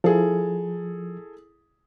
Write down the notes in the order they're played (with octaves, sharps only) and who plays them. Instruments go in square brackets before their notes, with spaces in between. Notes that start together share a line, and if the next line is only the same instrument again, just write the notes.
[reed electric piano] F3 [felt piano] E4 G#4 A4